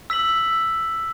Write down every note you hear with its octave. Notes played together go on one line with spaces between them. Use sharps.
E6 B6 F#7